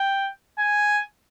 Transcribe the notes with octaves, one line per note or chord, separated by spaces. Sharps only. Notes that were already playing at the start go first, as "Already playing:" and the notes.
Already playing: G5
G#5